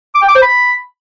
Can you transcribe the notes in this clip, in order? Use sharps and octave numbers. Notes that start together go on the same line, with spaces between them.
D6
G5
D6
C5
B5